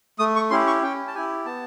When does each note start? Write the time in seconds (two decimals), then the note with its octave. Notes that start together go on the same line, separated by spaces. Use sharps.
0.19 A3 D#6
0.36 C#6
0.50 C#4 E4 G4 C6
0.67 C#6
0.82 C#4 G5
1.08 A5
1.15 E4 G4 G#5
1.45 B3 A5